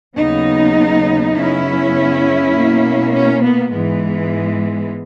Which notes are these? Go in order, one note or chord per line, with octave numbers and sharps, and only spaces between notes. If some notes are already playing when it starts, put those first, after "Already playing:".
D#2 C#3 F#3 B3 D#4
F#2 C#3 F#3 B3 C#4 E4
B2 A#3
C#4
B3
G#2 E3 G#3 B3